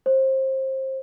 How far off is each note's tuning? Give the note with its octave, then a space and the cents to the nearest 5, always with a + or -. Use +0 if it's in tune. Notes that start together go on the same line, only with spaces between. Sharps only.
C5 +25